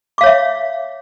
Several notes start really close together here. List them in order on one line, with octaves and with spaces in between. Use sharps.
D6 F5 C#5 E5